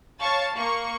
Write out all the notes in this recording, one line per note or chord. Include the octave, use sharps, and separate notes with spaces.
C#5 F5 A5 C#6 A6
A#3 C#6